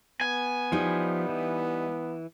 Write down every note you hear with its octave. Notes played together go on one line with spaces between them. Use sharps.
B3 G#5
F3 G3 D#4 E4
E3